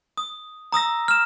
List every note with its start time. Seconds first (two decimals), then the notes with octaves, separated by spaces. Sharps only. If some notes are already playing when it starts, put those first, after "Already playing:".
0.17 D#6
0.72 A#5 D#6 E6 A#6
1.08 F6 E7